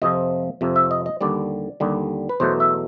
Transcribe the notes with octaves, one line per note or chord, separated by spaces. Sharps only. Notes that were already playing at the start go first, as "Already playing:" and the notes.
F2 C3 F3 D#5
F2 C3 F3
E5
D#5
D#5
D#2 D3 G3 D5
D#2 D3 G3
B4
E2 B2 F#3 A3 C5
E5